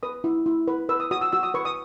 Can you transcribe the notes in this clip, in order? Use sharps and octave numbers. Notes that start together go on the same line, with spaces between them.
B4 D#6
E4
E4
B4
B4 E6
D#6
F#4 D#6
E6
F#4 E6
D#6
B4 C#6
D#6